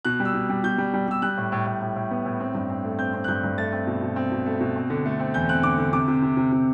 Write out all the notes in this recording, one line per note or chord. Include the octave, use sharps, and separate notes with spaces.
B2 F#6
G3
E6
B2
G3
B2 G6
G3
G3
G3 E6
G3 F#6
A2
A2
A2
A2
A2
B3
A2
C4
G2
C4
A3
C4 G6
C4
F#6
G2 G6
G2
A3 A6
C4
B2
B2
C4
B2
A3
B2
C4
D3
A3
C4
E2 G6
C4 F#6
D3 D6
D3
C3 D6
C3
C3
C3
C3